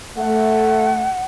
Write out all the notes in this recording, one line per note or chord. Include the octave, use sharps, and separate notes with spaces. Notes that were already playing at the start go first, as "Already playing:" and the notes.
A3 F#5